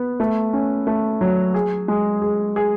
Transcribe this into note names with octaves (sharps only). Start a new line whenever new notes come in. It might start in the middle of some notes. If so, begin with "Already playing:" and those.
Already playing: B3
A3
C#4
A3
F#3
G#4
G#3
G#4
G#4